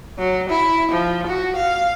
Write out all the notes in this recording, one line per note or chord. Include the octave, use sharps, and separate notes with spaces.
F#3
E4
F3
F#4
F5